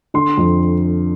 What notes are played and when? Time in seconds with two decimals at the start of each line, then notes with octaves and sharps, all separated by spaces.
0.14 D3 C6
0.37 F2